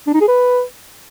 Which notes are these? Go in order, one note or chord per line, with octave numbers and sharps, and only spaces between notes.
D4
D#4
G#4
B4